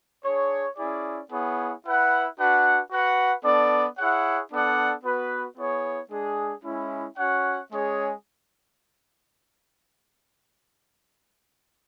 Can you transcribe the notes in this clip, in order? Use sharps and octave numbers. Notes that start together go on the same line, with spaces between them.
D4 G#4 C#5
C#4 E4 G#4 D5
B3 E4 G#4 C#5 F#5
E4 B4 F#5
D4 F#4 B4 F#5
F#4 B4 F#5
B3 D4 A4 D5
E4 G#4 C#5 F#5
B3 D4 A4 D5 F#5
B3 F#4 B4
B3 E4 G#4 C#5
G#3 D4 G#4
G#3 C#4 E4
C#4 F#4 C#5 F#5
G#3 C#4 G#4 C#5